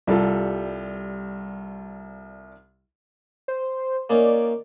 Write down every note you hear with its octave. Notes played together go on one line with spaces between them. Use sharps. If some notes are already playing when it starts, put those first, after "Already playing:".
C2 G3 F4 A4
C5
A#3 C#4 D#4 D5